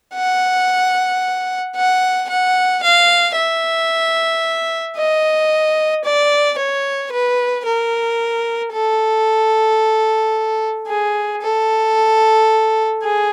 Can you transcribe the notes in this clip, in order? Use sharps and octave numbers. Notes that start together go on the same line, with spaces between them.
F#5
F#5
F#5
F5
E5
D#5
D5
C#5
B4
A#4
A4
G#4
A4
G#4